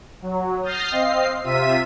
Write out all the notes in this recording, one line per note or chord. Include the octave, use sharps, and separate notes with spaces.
F#3
D#6 F6 G6 A6 A#6 C7
C4 D#5 F5 C7
C3 F4 E5 B6 D#7